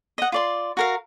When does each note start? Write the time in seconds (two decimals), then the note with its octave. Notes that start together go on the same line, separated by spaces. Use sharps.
0.18 D#5 F#5
0.32 F4 D5 C6
0.77 F#4 A#4 F5